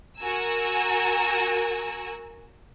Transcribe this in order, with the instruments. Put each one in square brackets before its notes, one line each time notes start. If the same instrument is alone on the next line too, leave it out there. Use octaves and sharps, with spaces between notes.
[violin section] F#4 A#4 G#5 A#5 E6